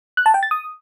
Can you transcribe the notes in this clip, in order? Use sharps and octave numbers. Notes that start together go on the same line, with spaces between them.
F#6
A5
G5
A6
D#6